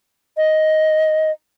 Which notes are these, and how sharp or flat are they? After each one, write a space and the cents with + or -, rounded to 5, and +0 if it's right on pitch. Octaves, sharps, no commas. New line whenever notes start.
D#5 +10